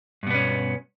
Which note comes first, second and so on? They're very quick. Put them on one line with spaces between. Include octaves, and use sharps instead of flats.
G2 B2 B3 C#4